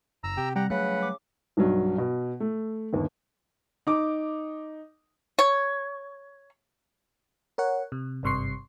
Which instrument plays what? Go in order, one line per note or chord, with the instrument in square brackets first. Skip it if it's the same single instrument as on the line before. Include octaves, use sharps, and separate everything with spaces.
[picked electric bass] F#1 [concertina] A#5 E6
[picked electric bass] C3 [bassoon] G4
[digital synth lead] G3 [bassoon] G4 [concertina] F#5 A#5
[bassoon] C#3 [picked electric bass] F#3 G3 A3 [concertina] B4 F#5 [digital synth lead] F#6
[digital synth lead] D6
[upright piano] B1 G2 F#3
B2
A3
G1 D#2
D#4 D6
[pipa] C#5
[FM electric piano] A#4 C#5 F#5
C3
G#1 G2 C3 C6 C#6 C7